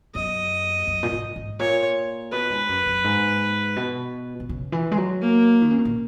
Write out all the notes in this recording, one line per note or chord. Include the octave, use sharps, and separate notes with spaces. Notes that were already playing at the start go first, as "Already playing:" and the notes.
F#2 D#5
F#2
A#2
G#2
G#2
A#2 C#5
B2 B4
G#2
F#2
F#2
G#2
B2
B2
C#3
E3
G#3
F#3
A#3
D#3
C#3
B2
A#2